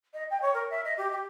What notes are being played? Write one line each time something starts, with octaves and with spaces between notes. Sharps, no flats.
D#5
G5
C#5
A#4
E5
D#5
G4
G4